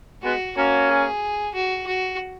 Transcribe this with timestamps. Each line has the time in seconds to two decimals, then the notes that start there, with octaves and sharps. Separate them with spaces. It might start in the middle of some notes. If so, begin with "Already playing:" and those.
0.23 G#3 B3 F#4
0.57 A#3 C#4 F#4
0.89 G#4
1.55 F#4
1.87 F#4